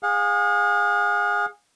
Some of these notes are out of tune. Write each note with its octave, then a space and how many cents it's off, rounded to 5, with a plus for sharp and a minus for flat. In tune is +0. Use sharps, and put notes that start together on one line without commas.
G#4 -20 F5 +45